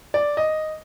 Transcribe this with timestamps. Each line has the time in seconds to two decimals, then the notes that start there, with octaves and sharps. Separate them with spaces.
0.14 D5
0.37 D#5